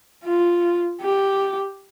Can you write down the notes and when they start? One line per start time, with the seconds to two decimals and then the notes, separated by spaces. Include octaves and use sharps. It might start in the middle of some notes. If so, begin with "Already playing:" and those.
0.24 F4
1.02 G4